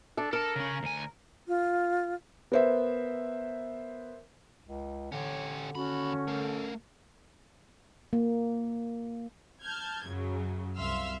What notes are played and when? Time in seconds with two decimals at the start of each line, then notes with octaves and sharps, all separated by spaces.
0.17 D4 A4
0.33 A4 A#4 A5
0.56 C#3 C#4
0.83 D2 G#5
1.48 F4
2.52 B3 A#4 C5 E5
4.65 C#2
5.12 D3 C#4 G4 C#5
5.75 D#2 C#4 F#4 B5
6.28 A3 A4 A#4
8.13 A#3
9.62 A5 F6 G6 G#6
10.06 F#2 C#3 F#3
10.78 C2 E5 F5 C6 E6 F6